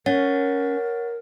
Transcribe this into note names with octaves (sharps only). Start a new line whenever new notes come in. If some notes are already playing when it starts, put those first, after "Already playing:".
C#4 A#4 C#5 F#5 A6